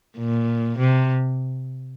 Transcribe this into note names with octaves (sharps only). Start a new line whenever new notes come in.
A#2
C3